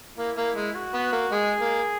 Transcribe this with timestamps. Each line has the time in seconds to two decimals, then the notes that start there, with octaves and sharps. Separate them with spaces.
0.17 A#3 E4
0.37 A#3
0.56 G#3
0.75 F#4
0.94 B3
1.12 A#3
1.31 G#3 G#4
1.61 A#3